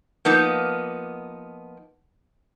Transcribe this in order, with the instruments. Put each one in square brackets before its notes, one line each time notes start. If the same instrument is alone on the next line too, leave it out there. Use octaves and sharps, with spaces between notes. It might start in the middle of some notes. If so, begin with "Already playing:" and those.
[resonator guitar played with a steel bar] F3 A#3 B3 D#4